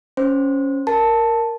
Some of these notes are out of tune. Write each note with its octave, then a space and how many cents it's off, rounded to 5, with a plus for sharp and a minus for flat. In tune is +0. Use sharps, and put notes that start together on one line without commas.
C#4 +0 C5 +0
A#4 -5 A5 +0